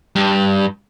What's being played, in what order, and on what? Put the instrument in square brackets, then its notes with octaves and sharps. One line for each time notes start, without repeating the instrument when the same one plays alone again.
[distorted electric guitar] G2